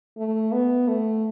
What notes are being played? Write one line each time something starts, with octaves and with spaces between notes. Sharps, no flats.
A3
B3
A3